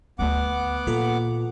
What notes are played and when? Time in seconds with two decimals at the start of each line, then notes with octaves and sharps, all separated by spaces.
0.19 D2 A3 B3 F#5 D6
0.87 A#2 E3 F4 A4